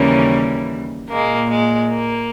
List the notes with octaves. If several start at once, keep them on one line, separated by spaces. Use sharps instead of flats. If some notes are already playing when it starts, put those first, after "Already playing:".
Already playing: D#2 C#3 E3 G3 A#3 C#4
A#2 G#3 A#3
G#3
A#3